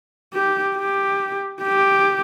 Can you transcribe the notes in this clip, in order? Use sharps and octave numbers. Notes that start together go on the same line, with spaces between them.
G4
G4
G4